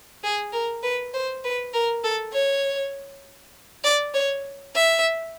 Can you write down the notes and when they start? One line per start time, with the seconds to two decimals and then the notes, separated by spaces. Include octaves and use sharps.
0.24 G#4
0.53 A#4
0.83 B4
1.13 C5
1.44 B4
1.74 A#4
2.04 A4
2.33 C#5
3.84 D5
4.14 C#5
4.75 E5